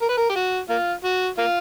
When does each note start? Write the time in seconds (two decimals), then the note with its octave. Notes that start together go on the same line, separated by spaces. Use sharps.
0.02 A#4
0.09 B4
0.18 A#4
0.30 G4
0.36 F#4
0.69 A#3 F4
1.04 F#4
1.38 A#3 F4